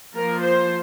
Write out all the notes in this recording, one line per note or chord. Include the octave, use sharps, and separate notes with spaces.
F3 A#3 F4 A#4
C5